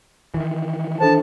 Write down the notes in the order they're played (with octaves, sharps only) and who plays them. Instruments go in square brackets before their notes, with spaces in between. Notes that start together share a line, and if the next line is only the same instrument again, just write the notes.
[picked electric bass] D#3 E3
[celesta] D4 A4 C5 [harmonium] A5